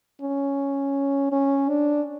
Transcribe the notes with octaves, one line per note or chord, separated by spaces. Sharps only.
C#4
C#4
D4